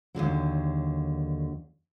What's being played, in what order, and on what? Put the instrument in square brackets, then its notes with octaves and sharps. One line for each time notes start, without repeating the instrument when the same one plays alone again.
[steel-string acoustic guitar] D#2 A#2 D3 F#3